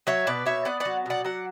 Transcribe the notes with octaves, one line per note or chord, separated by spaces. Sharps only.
F#3 C#5 E5
B2 B4 D5
B2 C#5 E5
B3 D5 F#5
F#3 D5 F#5
B2 D5 F#5
F#3 D5 F#5